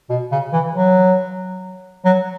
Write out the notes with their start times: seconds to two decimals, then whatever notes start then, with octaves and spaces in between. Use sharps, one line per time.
0.10 B2
0.32 C#3
0.53 E3
0.75 F#3
2.05 F#3